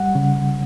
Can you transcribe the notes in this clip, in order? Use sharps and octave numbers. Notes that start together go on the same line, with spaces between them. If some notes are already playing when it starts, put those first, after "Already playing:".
Already playing: G3 F#5
C#3